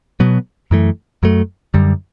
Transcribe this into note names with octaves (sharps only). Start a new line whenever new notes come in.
B2 F#3 B3
F#2 E3 A3
F#2 F#3 A3
F#2 D3 G3